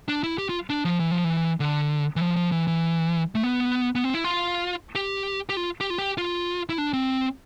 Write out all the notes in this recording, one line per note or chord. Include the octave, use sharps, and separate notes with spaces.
D4
E4
G4
F4
D4
F3
E3
F3
E3
D3
E3
F3
F3
E3
E3
A3
B3
B3
C4
E4
F4
G4
G4
F4
G4
F4
G4
F4
E4
D4
C4